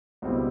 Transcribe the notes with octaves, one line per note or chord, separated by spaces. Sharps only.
C#2 B2 G3 C4 E4